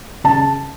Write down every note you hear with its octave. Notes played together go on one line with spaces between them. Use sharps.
C#3 A5